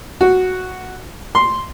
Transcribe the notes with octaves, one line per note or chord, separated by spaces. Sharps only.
F#4
C6